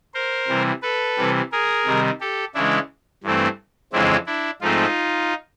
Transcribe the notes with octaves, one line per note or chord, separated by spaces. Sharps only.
A#4 C5
C3 E3 G3
A4 B4
C3 E3 G3
G#4 A#4
C3 D#3 G3
G4 A4
C#3 E3 G#3 D4 E4
G2 E3 A3 C4
F2 C#3 E3 G#3 C4 D4 E4
D4 E4
G#2 F3 A3 C4 D#4 F4